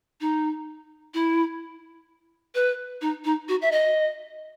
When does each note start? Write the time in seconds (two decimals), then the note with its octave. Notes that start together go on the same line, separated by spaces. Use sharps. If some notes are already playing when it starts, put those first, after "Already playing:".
0.21 D#4
1.14 E4
2.55 B4
3.01 D#4
3.25 D#4
3.49 F#4
3.62 E5
3.72 D#5